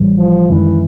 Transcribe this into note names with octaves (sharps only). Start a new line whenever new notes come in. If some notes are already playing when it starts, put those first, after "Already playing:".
Already playing: A1 A2 E3 G3
F3
F#2 D#3 E3 G#3